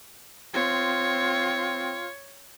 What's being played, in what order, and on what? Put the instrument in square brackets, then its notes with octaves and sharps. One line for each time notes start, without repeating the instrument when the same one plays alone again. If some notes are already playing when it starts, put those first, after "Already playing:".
[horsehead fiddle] C4 [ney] F4 [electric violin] C#5